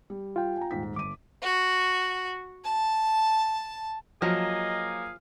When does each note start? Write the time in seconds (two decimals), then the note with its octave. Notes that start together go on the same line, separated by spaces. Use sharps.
0.10 G3
0.36 F4 G5
0.57 G#5 A#5
0.71 D#1 G#2 B6
0.96 G1 D6 D#7
1.43 F#4
2.65 A5
4.22 F3 F#3 A#3 G#4 D#5 F5